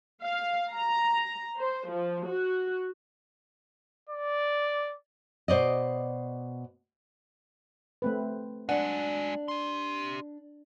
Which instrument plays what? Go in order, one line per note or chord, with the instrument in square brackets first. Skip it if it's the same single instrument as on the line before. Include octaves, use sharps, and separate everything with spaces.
[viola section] F5
A#5
C5
F3
F#4
[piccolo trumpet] D5
[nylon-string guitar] B2 C5 D5 D#5
[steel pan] A3 C4 B4
[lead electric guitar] G#3 F#4 [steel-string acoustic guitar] D4 [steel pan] F#5
[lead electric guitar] G4 C6